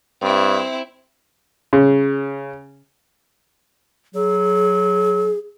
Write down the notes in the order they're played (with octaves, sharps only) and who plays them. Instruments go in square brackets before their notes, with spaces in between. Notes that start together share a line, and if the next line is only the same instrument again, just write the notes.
[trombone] G2 [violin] C4 E4
[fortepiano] C#3
[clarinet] F#3 [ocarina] G#4